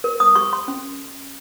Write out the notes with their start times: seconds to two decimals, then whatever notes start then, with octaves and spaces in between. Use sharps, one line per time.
0.04 A#4
0.20 D#6
0.36 G4 C#6
0.53 C6
0.68 C#4